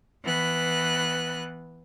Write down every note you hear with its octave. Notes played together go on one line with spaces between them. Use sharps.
E3 B3 F#6